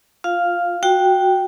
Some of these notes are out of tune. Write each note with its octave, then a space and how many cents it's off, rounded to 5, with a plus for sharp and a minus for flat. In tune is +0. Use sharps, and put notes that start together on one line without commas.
F4 +0 F5 +0
F#4 -10 G5 +0